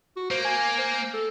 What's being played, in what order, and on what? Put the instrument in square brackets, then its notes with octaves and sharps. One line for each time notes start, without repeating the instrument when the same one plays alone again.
[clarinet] F#4
[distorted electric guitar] A#3 [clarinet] C5
[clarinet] G#5
C5
A4